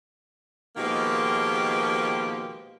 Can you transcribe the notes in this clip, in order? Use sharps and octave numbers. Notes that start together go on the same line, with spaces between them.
B2 D#3 F3 G#3 A#3 G4